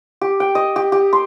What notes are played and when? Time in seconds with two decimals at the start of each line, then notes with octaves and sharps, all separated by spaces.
0.21 G4
0.40 G5
0.55 D#5
0.76 G4
0.92 G4
1.13 C6